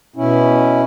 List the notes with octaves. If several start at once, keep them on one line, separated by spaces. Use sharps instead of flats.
B2 C#4 E4